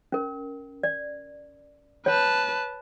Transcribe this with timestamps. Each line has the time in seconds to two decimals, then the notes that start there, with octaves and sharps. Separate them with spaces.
0.12 C#4 A#4
0.83 D5
2.06 B4 C#5 A5